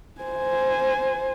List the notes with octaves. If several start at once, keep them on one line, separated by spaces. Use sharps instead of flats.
C5 G#5